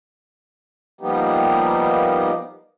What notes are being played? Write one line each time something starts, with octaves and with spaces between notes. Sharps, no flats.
F3 G3 A#3 B3 D#4 G4